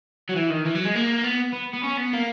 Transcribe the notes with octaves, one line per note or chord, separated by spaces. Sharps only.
F#3
E3
D#3
E3
F#3
G#3
A#3
B3
B3
B3
C#4
B3
A#3